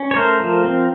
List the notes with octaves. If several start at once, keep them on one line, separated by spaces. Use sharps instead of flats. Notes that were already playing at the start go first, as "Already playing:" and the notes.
Already playing: C#4
C#5
A3 A#4 C5
F3
C4